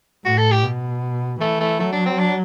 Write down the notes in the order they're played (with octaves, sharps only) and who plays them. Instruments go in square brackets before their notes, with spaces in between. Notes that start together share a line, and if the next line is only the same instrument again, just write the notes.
[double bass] A2 [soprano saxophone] F#4
[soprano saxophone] A4
G4
[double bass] B2
[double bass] E3 [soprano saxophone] A3
[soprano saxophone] A3
[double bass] F#3 [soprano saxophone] A3
[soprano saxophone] D4
C4
D4